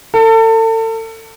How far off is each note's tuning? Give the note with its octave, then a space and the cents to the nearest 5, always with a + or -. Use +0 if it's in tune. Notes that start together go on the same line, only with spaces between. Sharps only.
A4 +35